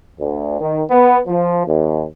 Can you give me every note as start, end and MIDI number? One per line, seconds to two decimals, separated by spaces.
0.19 0.57 38
0.59 0.81 51
0.90 1.17 59
1.27 1.62 53
1.65 2.03 39